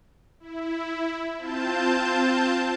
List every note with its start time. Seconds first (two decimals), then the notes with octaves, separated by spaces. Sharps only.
0.40 E4
1.38 C4 F4 A5 G6